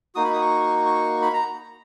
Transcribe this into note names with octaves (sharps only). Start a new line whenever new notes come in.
A#3 D#4 F#4 D#6
B5
D#6
C#6
C#6
B5
A#5